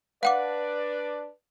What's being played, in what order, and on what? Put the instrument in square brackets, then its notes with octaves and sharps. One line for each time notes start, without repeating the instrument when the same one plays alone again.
[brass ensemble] D4 D5 [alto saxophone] B4 [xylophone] F5 F#5 D6